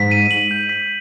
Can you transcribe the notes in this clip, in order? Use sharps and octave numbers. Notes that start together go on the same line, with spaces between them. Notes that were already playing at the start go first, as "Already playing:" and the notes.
Already playing: G#2 B6
D#7
F#7
G6
B6